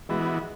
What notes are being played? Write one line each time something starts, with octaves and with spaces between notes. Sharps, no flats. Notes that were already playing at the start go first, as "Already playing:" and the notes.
E3 G#3 B3 F#4